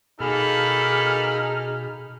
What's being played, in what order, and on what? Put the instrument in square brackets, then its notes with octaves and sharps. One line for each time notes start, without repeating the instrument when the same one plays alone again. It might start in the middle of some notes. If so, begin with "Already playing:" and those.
[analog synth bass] B2 [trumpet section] A#3 A4 B5 [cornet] D#4 [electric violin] G#4 F6